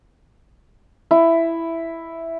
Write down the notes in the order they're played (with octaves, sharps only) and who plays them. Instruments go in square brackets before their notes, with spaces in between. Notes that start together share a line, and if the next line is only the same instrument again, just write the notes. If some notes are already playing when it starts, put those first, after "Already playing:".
[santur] E4